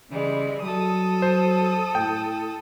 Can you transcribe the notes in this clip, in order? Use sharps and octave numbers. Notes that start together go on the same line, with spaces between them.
C#3 E3 G3 G#3
F#3 A4 D#6
C5
A2 G5